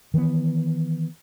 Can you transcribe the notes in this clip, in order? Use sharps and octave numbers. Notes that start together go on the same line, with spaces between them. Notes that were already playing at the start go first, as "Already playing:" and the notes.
D#3 E3 G#3 B3